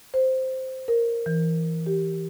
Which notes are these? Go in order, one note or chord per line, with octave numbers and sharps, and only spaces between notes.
C5
A#4
E3
G4